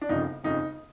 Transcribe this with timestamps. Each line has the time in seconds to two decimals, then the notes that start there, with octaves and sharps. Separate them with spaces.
0.01 D4
0.09 G1 F2 C#3 F3 D#4
0.44 G1 F2 C#3 F3 D#4